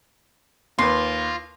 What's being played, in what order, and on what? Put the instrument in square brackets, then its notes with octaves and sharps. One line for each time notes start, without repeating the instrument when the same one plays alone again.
[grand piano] D#2 B4 [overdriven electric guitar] F4 [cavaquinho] C6